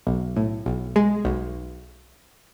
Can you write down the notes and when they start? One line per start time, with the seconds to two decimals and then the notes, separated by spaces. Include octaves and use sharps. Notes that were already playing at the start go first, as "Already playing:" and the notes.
0.07 B1
0.36 A2
0.66 B1
0.96 G#3
1.25 B1